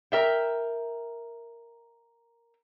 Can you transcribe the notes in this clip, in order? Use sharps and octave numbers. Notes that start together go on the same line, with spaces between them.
A#4 E5 G5